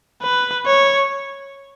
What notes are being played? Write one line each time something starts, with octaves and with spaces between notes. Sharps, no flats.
B4
C#5